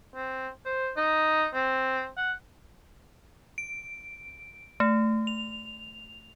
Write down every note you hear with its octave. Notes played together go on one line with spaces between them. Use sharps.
C4
C5
D#4
C4
F#5
D7
A3
F7